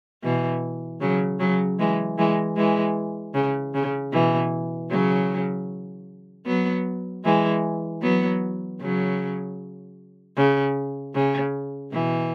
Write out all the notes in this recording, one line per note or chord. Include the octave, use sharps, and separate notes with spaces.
B2 E3
C#3 F#3
C#3 F#3
E3 G#3
E3 G#3
E3 G#3
C#3
C#3
B2 E3
C#3 F#3
F#3 B3
E3 G#3
F#3 B3
C#3 F#3
C#3
C#3
B2 E3